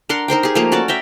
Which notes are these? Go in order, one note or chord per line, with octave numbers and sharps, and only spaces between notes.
D4 A#4 F#5 C6
D#4 A#4 C5 G5
G4 G#4
F3 A3 A#3 A#4
C#4 F#4 A4 D5
D5 E5 G5 A#5